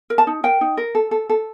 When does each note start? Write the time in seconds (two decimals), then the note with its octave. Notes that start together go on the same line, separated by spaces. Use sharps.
0.10 A#4
0.18 A5
0.27 D#4
0.44 A#4 G5
0.61 D#4
0.77 A#4
0.95 A4
1.11 A4
1.29 A4